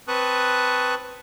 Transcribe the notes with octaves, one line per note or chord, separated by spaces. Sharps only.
C4 B4 A5 C#6 D#6 F#6